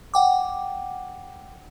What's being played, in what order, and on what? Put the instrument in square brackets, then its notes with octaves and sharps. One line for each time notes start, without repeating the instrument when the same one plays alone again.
[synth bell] F#5 G5 D6